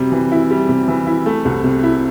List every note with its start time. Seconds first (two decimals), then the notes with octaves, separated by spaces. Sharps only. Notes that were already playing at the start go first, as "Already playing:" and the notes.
Already playing: C3 G3
0.12 E3
0.32 E4
0.51 G3
0.69 C3
0.88 E3
1.07 E4
1.26 A3
1.45 C2
1.64 C3
1.83 E4